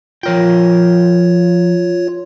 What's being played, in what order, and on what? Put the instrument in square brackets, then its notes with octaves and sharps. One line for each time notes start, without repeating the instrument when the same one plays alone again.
[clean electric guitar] F3 A#4 G5 [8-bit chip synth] F4 C#5